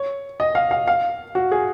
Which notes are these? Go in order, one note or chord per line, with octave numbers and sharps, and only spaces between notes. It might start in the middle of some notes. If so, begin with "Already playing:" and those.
Already playing: C#5
D#5
F5
F5
F5
F#4
G#4